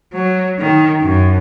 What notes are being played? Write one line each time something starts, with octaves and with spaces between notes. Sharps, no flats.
F#3
D#3
F#2